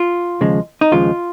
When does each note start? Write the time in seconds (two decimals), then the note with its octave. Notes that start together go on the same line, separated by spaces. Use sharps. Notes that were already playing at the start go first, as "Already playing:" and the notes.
Already playing: F4
0.41 D#2 C#3 F3 G#3
0.81 D#4
0.92 D#2 C#3 F3 G#3 F4